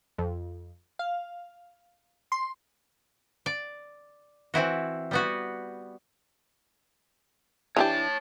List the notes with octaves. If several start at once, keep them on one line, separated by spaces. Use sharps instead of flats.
F2
F5
C6
D5
E3 C4 E4 F#4
G3 B3 F#4
E3 D4 G4 C#5 A5